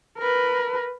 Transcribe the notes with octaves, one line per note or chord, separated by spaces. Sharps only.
A#4 B4